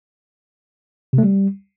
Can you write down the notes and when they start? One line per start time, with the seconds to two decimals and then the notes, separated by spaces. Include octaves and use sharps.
1.13 C3
1.18 A3
1.23 G3